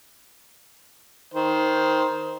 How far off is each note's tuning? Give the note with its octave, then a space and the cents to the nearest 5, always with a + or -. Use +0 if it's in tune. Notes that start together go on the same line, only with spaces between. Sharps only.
D#3 +15 C5 +0